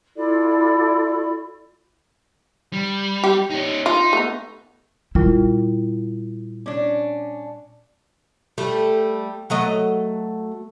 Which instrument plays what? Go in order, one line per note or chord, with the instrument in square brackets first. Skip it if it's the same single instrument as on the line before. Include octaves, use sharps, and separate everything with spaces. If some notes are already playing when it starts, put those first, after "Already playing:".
[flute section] E4 F4 A4 D5
[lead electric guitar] G3
[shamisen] G4
[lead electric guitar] C#4 D#4
[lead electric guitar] D#4 [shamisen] F4
[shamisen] A3 B3
[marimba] A#2 G3 F4 [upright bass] E4
[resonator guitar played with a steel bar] C#4 D4 [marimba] D6
[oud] G3 A3
F#3 A3 D#5